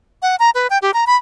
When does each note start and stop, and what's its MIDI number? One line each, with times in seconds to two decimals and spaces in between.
0.22 0.36 78
0.39 0.50 82
0.55 0.67 71
0.70 0.78 79
0.82 0.91 67
0.94 1.05 82
1.07 1.16 83